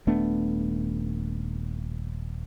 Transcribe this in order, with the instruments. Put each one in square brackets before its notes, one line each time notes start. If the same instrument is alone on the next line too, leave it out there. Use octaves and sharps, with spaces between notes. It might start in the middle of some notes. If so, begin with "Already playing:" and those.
[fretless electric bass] D#1 A3 B3 D4